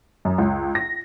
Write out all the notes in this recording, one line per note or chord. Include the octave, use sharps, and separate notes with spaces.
F#2
C#2
A#6